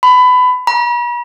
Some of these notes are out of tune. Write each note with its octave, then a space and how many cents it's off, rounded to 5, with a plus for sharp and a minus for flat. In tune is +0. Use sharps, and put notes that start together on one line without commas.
B5 +20
B5 -45